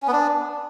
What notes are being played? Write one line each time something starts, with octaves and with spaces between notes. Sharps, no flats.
C#4
B3
D4